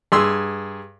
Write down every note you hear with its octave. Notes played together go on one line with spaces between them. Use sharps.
G2 G#4 C6 E6